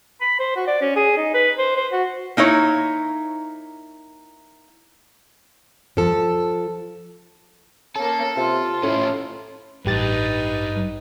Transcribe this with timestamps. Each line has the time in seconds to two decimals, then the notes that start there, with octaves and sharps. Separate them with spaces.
0.21 B5
0.39 C5
0.56 F#4
0.67 D5
0.81 C#4
0.96 G#4
1.17 D#4
1.34 B4
1.58 C5
1.76 C5
1.92 F#4
2.37 A#3 D#4 E4 C#5
5.97 F3 A4
7.96 A#3 C#4 A4 A5
8.36 C3 F4
8.83 A2 C#4 E4
9.85 A1 G2 D#4 G4 B4 A6